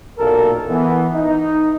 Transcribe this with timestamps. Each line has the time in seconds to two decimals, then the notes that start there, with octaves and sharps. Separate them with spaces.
0.19 F#1 B1 A#2 A#3 A4 A#4
0.69 E3 B3
1.14 D#4